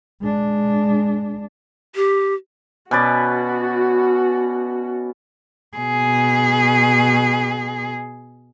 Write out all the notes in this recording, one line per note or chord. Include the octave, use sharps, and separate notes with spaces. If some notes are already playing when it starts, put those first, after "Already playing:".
G#3 D4
G4
B2 C#4 F#4 B4 D5
B2 G#4